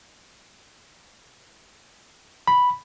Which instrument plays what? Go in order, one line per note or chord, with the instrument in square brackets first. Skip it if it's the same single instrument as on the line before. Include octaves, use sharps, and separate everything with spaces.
[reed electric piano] B5